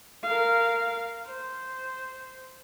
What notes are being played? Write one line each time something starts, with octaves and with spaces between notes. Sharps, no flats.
A#4 F5
C5